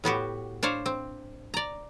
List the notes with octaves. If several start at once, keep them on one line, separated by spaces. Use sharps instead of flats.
A2 B3 F#4 G4
D4 C5 C#5 F5
C4
D5 A#5